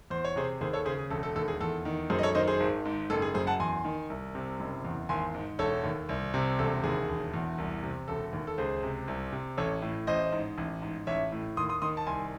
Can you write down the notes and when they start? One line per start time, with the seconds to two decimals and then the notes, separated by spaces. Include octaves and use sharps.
0.10 E2 C5
0.24 C#5
0.36 C3 G#4 C5
0.61 D#2 G#4 C5
0.73 A4 C#5
0.85 C#3 G#4 C5
0.98 G#4
1.10 E1 A4
1.23 A4
1.36 D#2 A4
1.48 G#4
1.61 E2 A4
1.85 D#3
2.10 F#2 G#4 C5
2.19 D#5
2.23 A4 C#5
2.35 D#3 C5 D#5
2.47 G#4 C5
2.60 G#1
2.85 G#2
3.10 F#1 A4
3.22 G#4
3.34 F#2 G#4 C5
3.47 F#5 A5
3.60 E2 G#5 C6
3.85 D#3
4.10 C2
4.35 C3
4.60 F#1
4.85 E2
5.09 G#1 G#5 C6
5.35 G#2
5.59 E1 A4 C#5
5.84 D#2
6.09 C2
6.34 C3
6.59 E1 A4
6.84 D#2 G#4
7.09 E1
7.34 E2
7.58 C2
7.83 C3
8.08 E1 A4
8.33 D#2
8.47 A4
8.58 C#2 G#4 C5
8.83 C3
9.08 C2
9.32 C3
9.57 A1 A4 C#5
9.82 A2
10.07 A1 C5 D#5
10.32 G#2
10.58 A1
10.82 G#2
11.07 A1 C#5 E5
11.32 A2
11.57 D#2 C6 D#6
11.69 C6 D#6
11.82 D#3 C6 D#6
11.97 A5
12.06 C2 G#5 C6